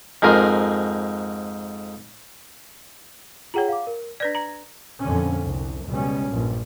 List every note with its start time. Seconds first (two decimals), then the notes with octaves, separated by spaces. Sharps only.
0.22 F2 G#2 A#4 G#5 C6
3.54 F4 G#4 C#5 F#5 G5 A#5
3.68 F5 D6
3.87 A#4
4.20 D4 B4 D5 G#6 A#6
4.35 A#5
5.02 F2 A#2 D3 C#4
5.43 C2
5.87 C#2 B2 G3 C#4
6.31 A#1 G2 F3